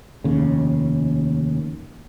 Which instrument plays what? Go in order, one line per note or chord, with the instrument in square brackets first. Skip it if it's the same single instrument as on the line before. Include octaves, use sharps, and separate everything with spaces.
[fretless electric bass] F1 D#2 C#3